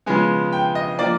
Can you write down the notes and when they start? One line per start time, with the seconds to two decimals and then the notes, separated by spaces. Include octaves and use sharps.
0.06 C#3 F3 G#3 B3 G#5
0.53 G5
0.75 D#5
0.99 F3 A#3 D5